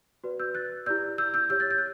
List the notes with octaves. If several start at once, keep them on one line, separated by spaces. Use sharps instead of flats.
F#4 B4 D5
E6 G6
F#6 A6
E4 G4 D5 E6 G6
E6 G6
E6 G6
G4 C#5 E6 G6
F#6 A6
G6
F#6